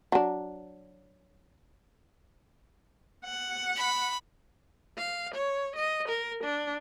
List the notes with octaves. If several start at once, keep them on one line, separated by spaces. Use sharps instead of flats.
F#3 D4
F#5
B5
F5
C#5
D#5
A#4
D4